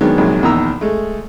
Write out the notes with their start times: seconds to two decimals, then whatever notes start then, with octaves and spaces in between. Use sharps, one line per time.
0.01 D#3 F#3 G#3 B3 D4
0.17 A#1 C3 D#3 F#3 G#3
0.42 A#1 E2 D#3 D#4 A#5 E6
0.81 G#3 A3